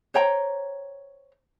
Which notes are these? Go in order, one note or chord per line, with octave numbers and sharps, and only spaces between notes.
C5 C#5 G5 A#5